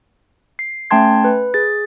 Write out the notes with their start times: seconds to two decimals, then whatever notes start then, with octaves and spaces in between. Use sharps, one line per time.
0.59 C7
0.90 A3 C#4 G5 A5 C6 G#6
1.24 B4
1.54 G#4 A6